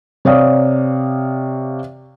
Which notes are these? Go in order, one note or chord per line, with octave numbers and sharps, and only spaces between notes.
C3 C#5 D5 F5 D#6